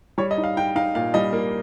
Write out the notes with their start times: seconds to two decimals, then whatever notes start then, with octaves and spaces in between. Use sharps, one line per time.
0.18 G3 C#5
0.31 D#5
0.38 D#4
0.44 F5
0.57 D#4 G5
0.76 D#4 F5
0.95 A#2 F5
1.14 G3 D#5
1.33 A#3